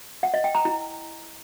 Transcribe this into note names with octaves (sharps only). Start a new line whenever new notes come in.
F#5
D#5
G5
A#5
E4